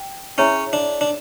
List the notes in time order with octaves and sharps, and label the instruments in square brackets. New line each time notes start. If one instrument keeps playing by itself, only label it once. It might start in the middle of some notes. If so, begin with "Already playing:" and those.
Already playing: [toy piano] G5
[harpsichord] C#4 [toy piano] E4 G#4 C#5 E5
[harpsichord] D4
D4